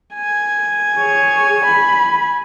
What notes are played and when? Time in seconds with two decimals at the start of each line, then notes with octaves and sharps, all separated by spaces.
0.14 G#5
0.99 G#4 C#5
1.66 B5